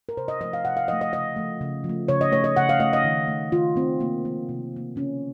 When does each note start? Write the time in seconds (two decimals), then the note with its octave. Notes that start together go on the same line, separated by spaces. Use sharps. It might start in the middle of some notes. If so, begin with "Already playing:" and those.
0.09 A#4
0.17 C3 C5
0.28 D#5
0.41 F3 A3 D#5
0.53 F5
0.65 C3 F#5
0.77 F5
0.88 F3 A3 D#5
1.01 D#5
1.13 C#3 D#5
1.36 F3 A3
1.61 C#3
1.84 F3
1.89 A3
2.08 C#3 C#5
2.21 D#5
2.32 A3 C#5
2.44 D#5
2.56 C#3 F#5
2.69 F5
2.80 A3 D#5
2.93 D#5
3.04 D#3
3.28 A3
3.52 D#3 F4
3.76 A3 C4
4.00 C3 A#3
4.25 F3 A#3
4.49 C3
4.73 F3 A#3
4.96 C#3 C#4